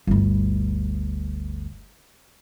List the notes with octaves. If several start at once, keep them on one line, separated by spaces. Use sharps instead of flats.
G1 D2